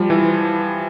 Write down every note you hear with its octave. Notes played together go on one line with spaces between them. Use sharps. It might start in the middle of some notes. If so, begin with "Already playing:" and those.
Already playing: F3 G3
E3